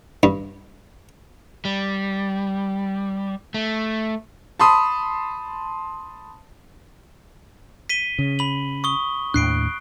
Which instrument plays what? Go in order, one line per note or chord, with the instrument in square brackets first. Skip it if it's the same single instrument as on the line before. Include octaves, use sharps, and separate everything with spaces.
[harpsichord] G2
[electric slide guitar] G3
A3
[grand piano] A5 B5 C6 D#6
[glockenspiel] B6 D#7 G7
[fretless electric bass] C#3
[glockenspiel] B5 F#7
C#6 D#6 G7
[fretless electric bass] D#2 A2 D4 [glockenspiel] F#6 C7 D7